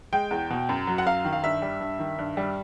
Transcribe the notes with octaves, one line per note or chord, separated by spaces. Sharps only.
G#3 G5
E2
B2
F#2
F#3
F#5
F#2 F5
D#3
F5
G2 E5
G3
G2
D#3
G2
G3